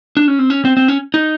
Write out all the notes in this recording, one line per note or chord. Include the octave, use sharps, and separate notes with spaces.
D4
C#4
C4
C#4
C4
C4
C#4
D#4